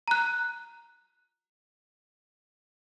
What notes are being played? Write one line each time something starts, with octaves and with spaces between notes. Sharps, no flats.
A#5 F#6